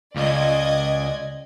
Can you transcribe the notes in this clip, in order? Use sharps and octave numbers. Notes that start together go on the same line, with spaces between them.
C#2 D5 D#5 G#6